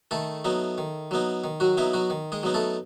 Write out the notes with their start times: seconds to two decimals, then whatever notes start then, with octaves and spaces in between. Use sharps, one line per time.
0.11 D#3 A3 A4
0.45 F#3 B3 D#4
0.78 D#3
1.11 F#3 B3 D#4
1.44 D#3
1.60 F#3 F#4
1.77 F#3 B3 D#4 E4
1.94 F#3 F#4
2.10 D#3
2.32 G#3 G#4
2.43 F#3 B3 D#4
2.54 A3 A4